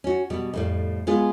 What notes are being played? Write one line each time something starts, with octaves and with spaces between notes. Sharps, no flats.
C#4 F#4
B2 G3
F2 A2 G3
G#3 B3 F4 G#4